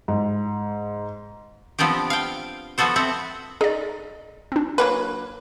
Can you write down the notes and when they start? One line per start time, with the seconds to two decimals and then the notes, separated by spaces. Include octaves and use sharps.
0.08 G#2
1.79 F3 B3 C4 D4 G4
2.10 F5 G5
2.78 F3 B3 F#4 A4 C5
2.96 C4 E5 F#5
3.61 D#4 G#4 D5
4.52 C4 D4
4.78 F#3 A#3 B4